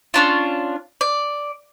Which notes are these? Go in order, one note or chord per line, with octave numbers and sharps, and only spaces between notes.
C#4 D4 F4
D5